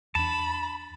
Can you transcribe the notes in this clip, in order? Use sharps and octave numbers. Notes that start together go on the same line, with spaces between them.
E2 D4 A5 B5